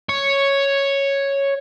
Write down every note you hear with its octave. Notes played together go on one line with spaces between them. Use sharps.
C#5